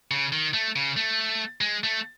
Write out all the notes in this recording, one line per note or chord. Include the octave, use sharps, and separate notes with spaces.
C#3
D#3
A3
C#3
A3
G#3
A3